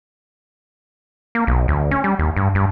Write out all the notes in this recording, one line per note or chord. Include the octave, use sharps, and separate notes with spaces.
A#3
B1
D2
C#4
G3
D#2
G2
G2